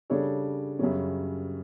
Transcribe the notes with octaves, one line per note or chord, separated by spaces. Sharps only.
C#3 G3 D4 A4 C#5
F#2 C#3 G3 C#4